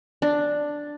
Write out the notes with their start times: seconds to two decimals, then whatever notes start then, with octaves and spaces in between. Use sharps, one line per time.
0.22 D4